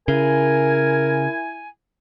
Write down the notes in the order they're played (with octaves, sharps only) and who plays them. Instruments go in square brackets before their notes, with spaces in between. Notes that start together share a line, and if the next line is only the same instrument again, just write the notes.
[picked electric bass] C#3 [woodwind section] E4 G#5 [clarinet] A#4